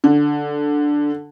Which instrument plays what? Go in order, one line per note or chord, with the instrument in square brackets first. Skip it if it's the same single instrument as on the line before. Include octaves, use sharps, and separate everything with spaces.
[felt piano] D3